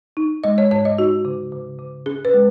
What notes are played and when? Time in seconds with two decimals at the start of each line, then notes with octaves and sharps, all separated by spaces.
0.17 D#4
0.44 G#3 D#5
0.58 C#5
0.71 G#2 C#5
0.85 D#5
0.98 D#4 F#4
1.25 C#3
1.52 C#3
1.79 C#3
2.06 C#4 G#4
2.25 B4
2.34 G#3